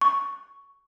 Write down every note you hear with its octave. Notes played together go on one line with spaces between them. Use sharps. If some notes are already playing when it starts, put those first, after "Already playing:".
C#6